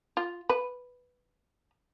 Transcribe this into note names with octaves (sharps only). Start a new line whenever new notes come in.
F4
B4